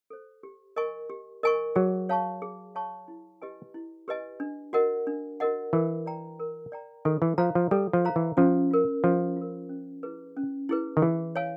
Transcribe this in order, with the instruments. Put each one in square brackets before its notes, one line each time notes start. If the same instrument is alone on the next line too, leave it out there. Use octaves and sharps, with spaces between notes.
[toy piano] A4 C5
G4
A#4 D#5 G#5 C#6
G4
A#4 D#5 G#5 C#6
[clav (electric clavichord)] F#3 [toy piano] G#4
[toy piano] C#5 F5 A5 C#6
G#4
C#5 F5 A5 C#6
E4
G4 B4 D#5 G#5
E4
G4 B4 D#5 G#5
D4
F#4 A#4 D#5 F#5
D4
F#4 A#4 D#5 F#5
[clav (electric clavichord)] E3 [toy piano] A#4
[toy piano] D5 G5 A#5
A#4
D5 G5 A#5
[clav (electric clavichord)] D#3 [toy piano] A4
[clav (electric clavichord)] E3
[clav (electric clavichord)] F3 [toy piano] C5 F5 A#5
[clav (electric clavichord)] F3
[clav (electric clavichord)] G3 [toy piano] A4
[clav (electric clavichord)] F3
[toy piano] C5 F5 A#5
[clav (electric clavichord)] E3
[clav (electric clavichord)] F3 [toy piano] C#4
[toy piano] F4 A#4
[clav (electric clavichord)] F3 [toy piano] C#4
[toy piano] F4 A#4
C#4
E4 G#4 B4
C#4
E4 G#4 B4
[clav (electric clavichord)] D#3
[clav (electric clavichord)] E3 [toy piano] G#4
[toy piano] C#5 F5 G#5